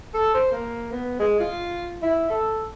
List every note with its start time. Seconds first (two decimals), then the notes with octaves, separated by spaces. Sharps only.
0.14 A4
0.34 C5
0.52 A#3
0.92 B3
1.19 G#3
1.40 F4
2.03 E4
2.30 A4